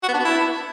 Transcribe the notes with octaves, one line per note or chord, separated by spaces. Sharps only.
F#4
B3
D4
B3
E4